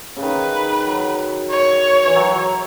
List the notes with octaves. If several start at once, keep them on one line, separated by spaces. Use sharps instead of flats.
C#3
D#3 B4
F#3
C#5
E3
F#3